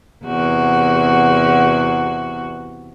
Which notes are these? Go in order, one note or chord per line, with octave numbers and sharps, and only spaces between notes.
E2 C3 F#4